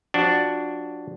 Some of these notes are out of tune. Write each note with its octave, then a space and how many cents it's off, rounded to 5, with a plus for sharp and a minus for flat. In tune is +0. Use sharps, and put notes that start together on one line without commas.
F3 +30 D4 +0 F#4 +20